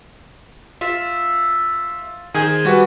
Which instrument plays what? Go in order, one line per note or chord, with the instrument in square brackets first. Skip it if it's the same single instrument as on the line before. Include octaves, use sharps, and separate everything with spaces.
[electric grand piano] F4 [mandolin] E5
[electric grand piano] D#3 [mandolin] G#4 C5 G#5
[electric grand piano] G3 F#4 B4